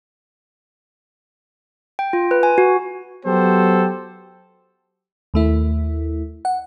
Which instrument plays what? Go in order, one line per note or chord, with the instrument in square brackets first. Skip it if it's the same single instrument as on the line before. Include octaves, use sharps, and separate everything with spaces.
[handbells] G5
F4
B4
G#5
F#4
[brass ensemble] F#3 B3 F#4 G4 A4 C5
[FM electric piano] D#2 A3 E4
F#5